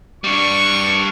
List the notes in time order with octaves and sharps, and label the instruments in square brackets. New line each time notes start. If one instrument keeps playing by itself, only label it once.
[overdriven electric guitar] G3 D4 [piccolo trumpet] C#6